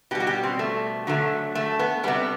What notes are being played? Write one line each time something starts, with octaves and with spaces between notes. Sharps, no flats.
B2 G3 G4
F#4
G4
C4
A3
D3 F#3 A3
A3
B3
C3 G3 B3